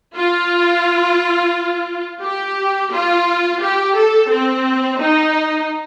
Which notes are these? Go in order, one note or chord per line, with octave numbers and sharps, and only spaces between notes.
F4
G4
F4
G4
A4
C4
D#4